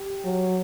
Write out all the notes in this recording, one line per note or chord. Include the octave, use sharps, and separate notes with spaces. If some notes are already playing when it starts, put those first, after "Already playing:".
Already playing: G4
F#3